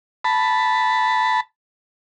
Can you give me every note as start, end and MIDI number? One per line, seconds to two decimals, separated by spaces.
0.25 1.40 81
0.25 1.40 83